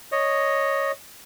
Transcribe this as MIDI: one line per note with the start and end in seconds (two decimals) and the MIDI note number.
0.12 0.92 73
0.12 0.92 75